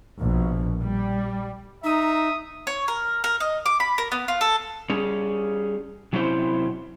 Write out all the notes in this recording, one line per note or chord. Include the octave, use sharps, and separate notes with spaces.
A#1 B2
G3
D#4 E5 A#5 D#6
C#5
A#4
A#4
D#5
D6
B5
A#4
B3
F4
A4
G3 C#4 G#4
C3 F#3 C4 C#4 E4 C5